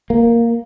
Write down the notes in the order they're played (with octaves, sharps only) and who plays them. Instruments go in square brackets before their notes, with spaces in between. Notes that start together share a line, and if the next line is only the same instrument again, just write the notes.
[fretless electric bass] A#3